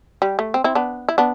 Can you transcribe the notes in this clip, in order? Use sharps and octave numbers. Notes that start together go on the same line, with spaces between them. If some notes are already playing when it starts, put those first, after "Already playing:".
G3
A3
C4
C4 E4
B3 D4
E4
B3 D4